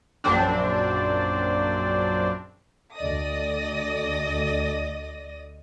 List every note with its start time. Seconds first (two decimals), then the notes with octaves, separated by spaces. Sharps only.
0.24 A#1 F#2 C4 D4
2.94 D2 D5 D#5 D#6 A#6